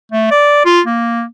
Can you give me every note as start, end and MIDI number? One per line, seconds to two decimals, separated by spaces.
0.12 0.30 57
0.31 0.65 74
0.66 0.81 65
0.86 1.24 58